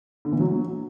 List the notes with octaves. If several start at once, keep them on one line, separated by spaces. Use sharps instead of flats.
D3
E3
F#3